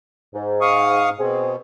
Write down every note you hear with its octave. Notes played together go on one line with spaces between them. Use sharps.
G#2
F5 C#6 D#6
B2 C4 G#4